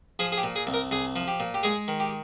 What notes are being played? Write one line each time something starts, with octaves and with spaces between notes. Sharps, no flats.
F3 G#4
G#4
G4
A#2
G#4
C2
A#4
C2 G#4
F3
G4
A#2
G4
G#3 G#4
D#3
G4